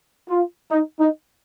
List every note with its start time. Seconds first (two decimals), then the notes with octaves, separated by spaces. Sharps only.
0.28 F4
0.70 D#4
0.99 D#4